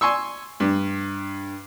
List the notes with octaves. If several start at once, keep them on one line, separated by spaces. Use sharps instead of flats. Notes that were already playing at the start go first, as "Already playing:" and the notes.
G#5 C6 C#6 E6
G2